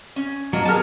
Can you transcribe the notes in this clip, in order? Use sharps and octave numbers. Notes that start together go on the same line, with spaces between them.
C#4
F#3 A#3 D4 D#5
B3 G#4 A#4 A5 F6